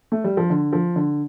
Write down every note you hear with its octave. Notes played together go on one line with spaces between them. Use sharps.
A3
G3
F3
D3
F3
D3